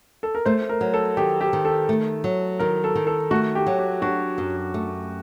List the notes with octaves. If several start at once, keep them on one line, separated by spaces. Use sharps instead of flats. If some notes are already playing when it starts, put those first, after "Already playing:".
A4
A#4
A3 C5
A#4
F#3
A4
D#3 G4
G4
D#3
A4
A3
F#3
D#3 A#4
A4
D#3
A4
A3 F#4
G4
F#3
G4
D4 F#4
F#2
A3